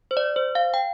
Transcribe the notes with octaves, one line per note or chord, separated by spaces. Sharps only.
C5
D5
C5
F5
G5